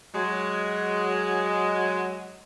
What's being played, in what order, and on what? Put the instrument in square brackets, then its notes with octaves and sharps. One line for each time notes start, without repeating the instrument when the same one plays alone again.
[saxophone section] F#3 G#3